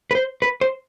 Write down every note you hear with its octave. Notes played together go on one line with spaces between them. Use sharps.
B4
C5
B4
C5